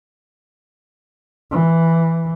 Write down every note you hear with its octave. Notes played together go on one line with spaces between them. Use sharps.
E3